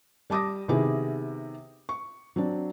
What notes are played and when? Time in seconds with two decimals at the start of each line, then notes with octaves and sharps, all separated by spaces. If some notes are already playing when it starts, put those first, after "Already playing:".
0.30 G3 A5 D6 D#6 A#6
0.68 C3 D#3 B3 E4 G4 G#4
1.89 C#6
2.36 F#3 C4 D4